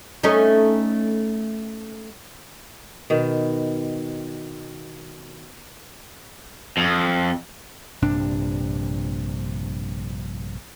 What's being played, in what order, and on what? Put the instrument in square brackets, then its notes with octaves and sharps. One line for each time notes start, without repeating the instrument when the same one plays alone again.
[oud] A3 C#4 D#4
[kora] B2 D#3
[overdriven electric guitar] F2
[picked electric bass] A#1 G2 C3 D4